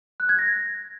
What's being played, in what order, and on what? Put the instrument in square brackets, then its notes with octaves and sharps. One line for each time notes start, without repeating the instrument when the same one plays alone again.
[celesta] F#6
G#6
A#6